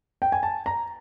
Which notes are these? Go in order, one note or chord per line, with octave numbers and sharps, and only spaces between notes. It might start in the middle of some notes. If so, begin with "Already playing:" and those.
G5
G#5
A5
A#5